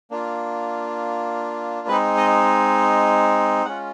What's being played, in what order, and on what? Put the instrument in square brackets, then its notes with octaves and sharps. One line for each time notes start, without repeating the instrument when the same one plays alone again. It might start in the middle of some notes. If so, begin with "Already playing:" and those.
[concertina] A#3 D4 F4
G#3 C4 D#4 B4
D#5
G#3 C#4 F4 F#5